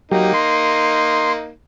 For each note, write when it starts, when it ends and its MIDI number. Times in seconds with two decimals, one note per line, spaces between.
0.11 0.33 54
0.11 1.51 58
0.11 1.51 63
0.11 0.33 67
0.34 1.33 84